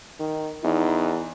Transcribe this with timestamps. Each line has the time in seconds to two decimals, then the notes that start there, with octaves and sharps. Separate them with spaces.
0.20 D#3
0.64 E2 D#4